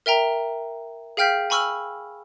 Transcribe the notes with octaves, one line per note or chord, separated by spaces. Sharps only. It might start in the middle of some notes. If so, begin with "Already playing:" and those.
A#4 E5 G5 A#5
G#4 F5 G5 F6 G6 B6
G#5 B5 C#6 E6 F6